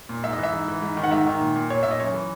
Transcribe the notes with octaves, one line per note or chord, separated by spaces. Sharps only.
A#2
G#2 E5
D#5
E3
E5
G#2
E3
G#2
D#3
F#5
G#2 E5
D#3
A#2
A#2
A#2 C#5
A#2 E5
D#5
F#2 C#5
E3